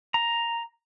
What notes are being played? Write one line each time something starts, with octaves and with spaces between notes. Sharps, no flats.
A#5